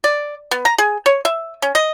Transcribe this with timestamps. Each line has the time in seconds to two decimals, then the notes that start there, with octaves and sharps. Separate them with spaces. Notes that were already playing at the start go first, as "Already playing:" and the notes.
0.04 D5
0.51 B3
0.65 A#5
0.78 G#4
1.06 C#5
1.25 E5
1.62 C#4
1.75 D#5